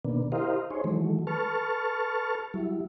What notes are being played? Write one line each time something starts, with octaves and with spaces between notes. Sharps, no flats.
B2 D#3 A#3 B3 D4
E4 G4 A#4 C5 D#5 F5
D#4 G#4 C5 C#5
D#3 E3 F#3 G#3 A3
A4 B4 A5 C#6 F6
F#3 G3 E4